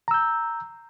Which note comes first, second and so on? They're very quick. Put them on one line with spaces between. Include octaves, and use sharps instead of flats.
A#5 E6 G6